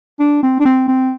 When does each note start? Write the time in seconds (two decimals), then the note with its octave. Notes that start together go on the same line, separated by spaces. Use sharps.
0.19 D4
0.43 C4
0.60 D4
0.65 C4
0.88 C4